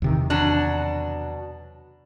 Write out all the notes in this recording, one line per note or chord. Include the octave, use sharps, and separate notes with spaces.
E2 C3 D#3
B2 F#3 D4